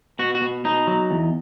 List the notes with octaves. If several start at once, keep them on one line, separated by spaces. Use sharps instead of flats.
B2 F#4
F#4
B2
B2 D#4
F#3
E2